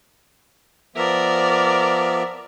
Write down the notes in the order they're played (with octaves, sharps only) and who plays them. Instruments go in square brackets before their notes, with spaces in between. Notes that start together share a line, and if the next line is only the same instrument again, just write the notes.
[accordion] F3 B3 E5 [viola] A#4 D5